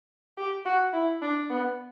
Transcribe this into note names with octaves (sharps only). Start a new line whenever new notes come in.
G4
F#4
E4
D4
B3